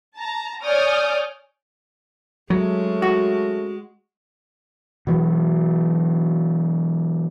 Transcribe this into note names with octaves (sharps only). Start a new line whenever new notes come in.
A5 A#5
C#5 D5 G#5 D#6 F6 G6
F#3 G#3 A3 C#4
F#4
B2 E3 F#3